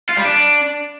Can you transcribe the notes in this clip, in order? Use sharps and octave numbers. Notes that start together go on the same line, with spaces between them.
F4
G3
D4